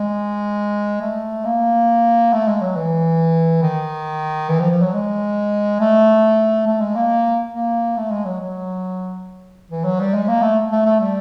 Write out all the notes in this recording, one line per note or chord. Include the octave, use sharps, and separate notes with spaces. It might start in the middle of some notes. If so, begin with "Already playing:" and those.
Already playing: G#3
A3
A#3
A3
G#3
F#3
E3
D#3
E3
F3
F3
F#3
G#3
A3
A3
G#3
A#3
A#3
A3
G#3
F#3
F#3
E3
F#3
G3
G#3
A#3
A3
A3
A3
G3